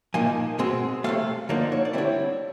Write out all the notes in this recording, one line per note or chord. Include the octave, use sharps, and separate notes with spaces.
A#2 F3 A#3 D#4 G#5
B2 G#3 C4
C3 E3 A3 F5
D3 F3 A#3 D#4 D5
C#5
D5
D3 G3 C4 E4 C#5